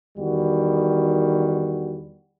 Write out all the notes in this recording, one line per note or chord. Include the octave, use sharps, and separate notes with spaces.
E2 D#3 G3 F#4